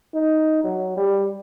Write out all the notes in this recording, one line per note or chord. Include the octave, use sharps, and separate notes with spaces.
D#4
F#3
G3